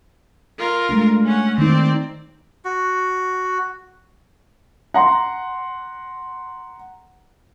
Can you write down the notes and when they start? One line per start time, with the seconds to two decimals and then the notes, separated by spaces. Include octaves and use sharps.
0.59 F4 A#4
0.89 G#3 A3 D4
1.25 C#4 F#5
1.58 D#3 C4 D#4 D5
2.65 F#4
4.94 F#5 A#5 C6